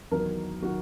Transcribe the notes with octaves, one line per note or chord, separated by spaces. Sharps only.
E2 D#3 F#3 A#4
D#3 F#3 F#4